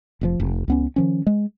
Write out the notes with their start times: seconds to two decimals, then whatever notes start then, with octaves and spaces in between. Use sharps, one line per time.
0.21 F1 A#2 F3
0.40 F1
0.68 C#2 B3 C#4
0.96 D#3 F3 C#4
1.27 G#3